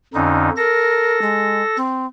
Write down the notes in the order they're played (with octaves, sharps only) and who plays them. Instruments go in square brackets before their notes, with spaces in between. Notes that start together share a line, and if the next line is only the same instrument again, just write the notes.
[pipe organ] F2 D3 D#4 [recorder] C#4
[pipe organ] A4 A#6 [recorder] A#4
[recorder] G#3
C4